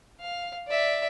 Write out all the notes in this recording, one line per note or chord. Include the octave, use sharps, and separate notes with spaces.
F5
D5 E5